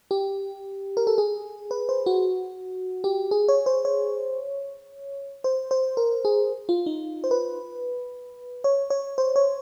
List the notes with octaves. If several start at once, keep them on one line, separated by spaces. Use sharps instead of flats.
G4
A#4
A4
G#4
B4
C5
F#4
G4
G#4
C#5
C5
C#5
C5
C5
A#4
G#4
F4
D#4
C5
B4
C#5
C#5
C5
C#5